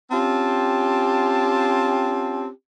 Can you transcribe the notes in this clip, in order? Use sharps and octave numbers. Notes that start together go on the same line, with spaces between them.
C4 C#4 F4 G4 A5